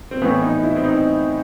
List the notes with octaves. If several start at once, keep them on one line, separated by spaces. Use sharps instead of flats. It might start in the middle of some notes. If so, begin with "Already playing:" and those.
C4
A2 E3 B3
D#4
E4
C4
D#4